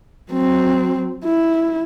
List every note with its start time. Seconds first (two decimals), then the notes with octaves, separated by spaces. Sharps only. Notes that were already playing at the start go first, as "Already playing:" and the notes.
0.31 F#3 C4
1.24 E4